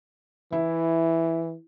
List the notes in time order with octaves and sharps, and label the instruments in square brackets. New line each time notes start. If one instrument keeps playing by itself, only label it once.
[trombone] E3 [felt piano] E4